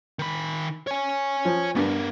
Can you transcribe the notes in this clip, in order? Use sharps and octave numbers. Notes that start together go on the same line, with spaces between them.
D#3 B5
C#5 G#5
F3
G2 B3 A#4